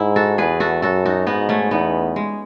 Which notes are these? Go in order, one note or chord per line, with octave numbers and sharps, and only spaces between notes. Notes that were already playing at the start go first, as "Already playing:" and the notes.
Already playing: G#2 E4
F#4 A4
E2 G#4 B4
F#4 A4
F#2 F#4 A4
D#4 F#4
G#2 B3 D#4
A3 C#4
E2 B3 D#4
G#3